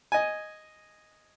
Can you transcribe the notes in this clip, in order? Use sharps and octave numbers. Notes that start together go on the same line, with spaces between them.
D#5 G#5